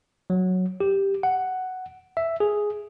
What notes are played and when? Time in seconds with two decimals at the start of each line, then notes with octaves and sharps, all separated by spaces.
0.30 F#3
0.80 G4
1.23 F#5
2.17 E5
2.40 G#4